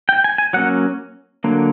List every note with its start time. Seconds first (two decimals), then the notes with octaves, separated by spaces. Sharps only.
0.09 G5
0.24 G#5
0.38 G#5
0.53 F#3 A#3 C#4 F#5
1.44 D3 F#3 A#3